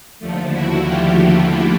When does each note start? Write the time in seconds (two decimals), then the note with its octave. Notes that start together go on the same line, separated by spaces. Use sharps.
0.19 D#2 D3 F3 A3
0.50 E4 F#4
0.81 F4 G4